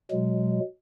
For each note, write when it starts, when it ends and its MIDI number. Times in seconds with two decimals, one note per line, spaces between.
0.11 0.60 47
0.11 0.60 54
0.11 0.60 56